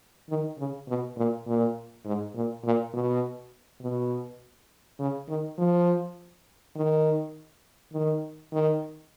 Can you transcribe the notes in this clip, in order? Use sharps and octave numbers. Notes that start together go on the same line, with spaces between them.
D#3
C#3
B2
A#2
A#2
G#2
A#2
A#2
B2
B2
C#3
D#3
F3
D#3
D#3
D#3